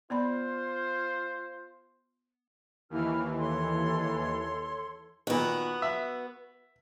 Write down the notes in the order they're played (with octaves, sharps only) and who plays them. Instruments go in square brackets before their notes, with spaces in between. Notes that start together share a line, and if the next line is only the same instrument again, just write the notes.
[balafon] B3 D5 B5 [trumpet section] F4 C5
[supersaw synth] D#2 E3 [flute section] E4 F6
[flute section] A4 C#5 C6
[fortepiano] A#2 D#3 [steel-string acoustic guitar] B3 F#4
[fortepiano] E5